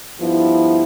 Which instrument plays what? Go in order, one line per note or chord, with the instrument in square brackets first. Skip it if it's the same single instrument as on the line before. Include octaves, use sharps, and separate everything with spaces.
[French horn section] G2 F3 B3 E4